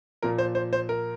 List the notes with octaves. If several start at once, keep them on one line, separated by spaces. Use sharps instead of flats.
A#2 F3 A#4
C5
C5
C5
A#4